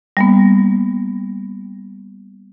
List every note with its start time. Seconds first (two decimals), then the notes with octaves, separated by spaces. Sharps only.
0.17 G3 A#3 B3